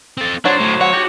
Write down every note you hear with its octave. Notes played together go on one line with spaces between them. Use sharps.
C4 A4
F#3 D4 C5 C#5 F#5
A2
C#5 F#5
F#4 G4